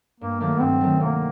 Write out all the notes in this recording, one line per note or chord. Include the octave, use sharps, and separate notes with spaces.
G2 A#3
D#3 F#3 A3 A#3
G2 C4
D#3 F#3 A3
C3 A#3